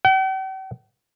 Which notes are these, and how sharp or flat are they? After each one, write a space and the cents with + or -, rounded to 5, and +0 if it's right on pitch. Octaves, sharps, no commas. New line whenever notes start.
G5 -45